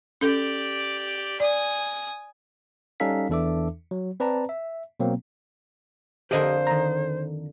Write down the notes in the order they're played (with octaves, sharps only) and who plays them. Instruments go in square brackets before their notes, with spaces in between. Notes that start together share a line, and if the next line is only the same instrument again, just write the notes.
[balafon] C#4 A4 [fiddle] G4 D5
[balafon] D5 [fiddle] G#5 D#6
[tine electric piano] G3 C#4 D#4 A4 F5 B6
E2 E3 D4 A4 E5 D6
F#3
C4 B4 D5 A5 A#5
E5
B2 F#3 A#3 C4
[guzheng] F2 D3 A#3 [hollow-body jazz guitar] G4 D#5 [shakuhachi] C5
[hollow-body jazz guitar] D#3 A#5